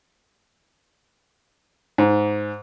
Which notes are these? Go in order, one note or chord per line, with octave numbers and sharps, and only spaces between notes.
G#2